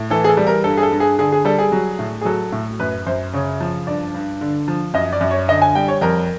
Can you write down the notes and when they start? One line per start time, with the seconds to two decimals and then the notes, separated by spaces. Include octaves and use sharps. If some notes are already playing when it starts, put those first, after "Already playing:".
Already playing: A2
0.10 E3 A4
0.24 G#4
0.29 A4
0.37 G3
0.47 A#4
0.64 G2 A4
0.77 G#4
0.83 A4
0.92 G2
1.00 G#4
1.19 D3 G#4
1.32 G#4
1.45 G3 A4
1.59 G#4
1.72 F#3
1.99 A2
2.21 G#4
2.25 F#3 A4
2.52 A2
2.80 F#2 B4
3.07 F#2 C5
3.33 C#3 C#5
3.60 F3
3.87 G2 D5
4.15 G2
4.41 D3
4.68 F3
4.94 F#2 D#5
5.13 D5
5.21 F#2
5.31 C#5
5.48 D3 D#5
5.62 G#5
5.75 G3 G5
5.88 C#5
6.01 F2 A#4